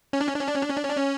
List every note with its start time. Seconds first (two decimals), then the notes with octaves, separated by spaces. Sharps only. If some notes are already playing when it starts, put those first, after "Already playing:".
0.13 C#4
0.21 D4
0.27 C#4
0.35 D4
0.41 C#4
0.48 D4
0.56 C#4
0.63 D4
0.70 C#4
0.77 D4
0.84 C#4
0.90 D4
0.97 C#4